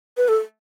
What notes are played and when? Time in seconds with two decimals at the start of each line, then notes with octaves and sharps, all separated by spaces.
0.17 B4
0.28 A4